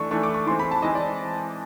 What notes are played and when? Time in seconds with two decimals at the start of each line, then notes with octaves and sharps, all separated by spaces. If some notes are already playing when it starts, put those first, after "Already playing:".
Already playing: E3 A3 D4 C#6
0.11 E3 A3 D4 C#6
0.23 D6
0.34 C#6
0.46 E3 G#3 C4 C6
0.59 B5
0.71 A5
0.82 E3 G#3 C4 D#5
0.95 D5